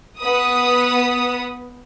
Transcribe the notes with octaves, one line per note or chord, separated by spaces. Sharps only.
B3 B4 D#6